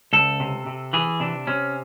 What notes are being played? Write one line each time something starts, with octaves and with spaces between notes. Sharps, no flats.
C#2 A4
C3
C3
E3 G#4
C3 D4
C3 C#4